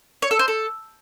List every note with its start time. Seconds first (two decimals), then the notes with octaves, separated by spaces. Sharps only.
0.22 C#5
0.31 A4
0.39 C5
0.48 A4